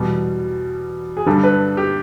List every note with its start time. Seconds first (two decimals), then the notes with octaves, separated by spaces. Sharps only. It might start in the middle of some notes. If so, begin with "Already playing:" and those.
Already playing: E2 B2 G3
1.17 G#4
1.26 G2 D3 G3 A4
1.43 B4
1.77 G4